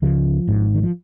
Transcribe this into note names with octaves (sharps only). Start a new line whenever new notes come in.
C#2 C#3 F3
G#1 G#2
D#3
F3